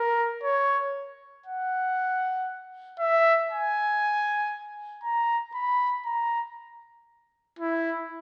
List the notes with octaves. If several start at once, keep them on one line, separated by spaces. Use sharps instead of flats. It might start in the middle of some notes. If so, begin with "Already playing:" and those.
Already playing: A#4
C#5
F#5
E5
G#5
A#5
B5
A#5
E4